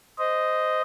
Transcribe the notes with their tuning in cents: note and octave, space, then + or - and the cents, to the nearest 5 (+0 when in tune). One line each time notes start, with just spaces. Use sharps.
C5 -15 D#5 +0